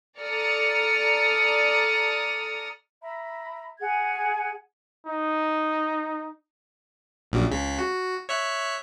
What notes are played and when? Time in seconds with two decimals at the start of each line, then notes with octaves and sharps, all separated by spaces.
0.20 A4 D5 A#5 D#6 F6 C#7
3.02 E5 A#5 B5
3.80 G#4 F#5 G#5 G#6
5.06 D#4
7.32 A#1 F#2 A#2
7.51 C#2 C#3 B6
7.79 F#4
8.29 C#5 E5 F#6